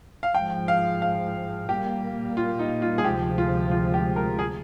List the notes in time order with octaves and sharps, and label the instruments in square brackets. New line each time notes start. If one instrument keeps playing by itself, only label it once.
[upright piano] F5
[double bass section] G#2 F3 G#3 [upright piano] G5
[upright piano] F5
F5
[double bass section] A#2 G3 A#3 [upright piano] G4
[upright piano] F4
D#4
F4
G#4
[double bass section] D2 C3 F3 G#3 [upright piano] G4
[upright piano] F4
F4
G4
A#4
G#4